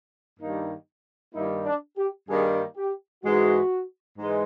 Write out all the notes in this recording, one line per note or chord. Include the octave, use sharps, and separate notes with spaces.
G2 D#3 G3 A#3 D#4
G2 D#3 G3 A#3 D#4 E4
D4
G4
G2 D#3 G3 A#3 D#4 G#4
G4
G#2 E3 G#3 F#4
G#2 E3 G#3